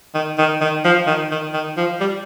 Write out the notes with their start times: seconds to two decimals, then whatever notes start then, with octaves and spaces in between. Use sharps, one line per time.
0.14 D#3
0.38 D#3
0.61 D#3
0.85 F3
1.07 D#3
1.31 D#3
1.53 D#3
1.77 F3
2.00 G3